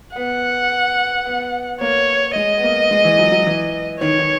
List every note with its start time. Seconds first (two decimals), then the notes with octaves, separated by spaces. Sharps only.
0.16 B3 F#5
1.25 B3
1.81 A#3 C#5
2.36 G#3 D#5
2.58 B3
2.63 A#3
2.91 G#3
3.04 E3
3.19 F#3
3.32 F#3
3.46 E3
4.01 D#3 C#5
4.19 D#3